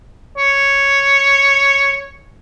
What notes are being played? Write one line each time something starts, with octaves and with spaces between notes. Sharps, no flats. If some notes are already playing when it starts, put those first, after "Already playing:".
C#5